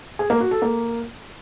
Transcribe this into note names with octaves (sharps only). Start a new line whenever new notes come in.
G#4
A#3
F#4
A4
A#3